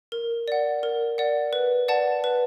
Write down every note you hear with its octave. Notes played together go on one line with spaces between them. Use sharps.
A#4
D5 F#5
A#4
D5 F#5
B4
D5 F#5 A5
B4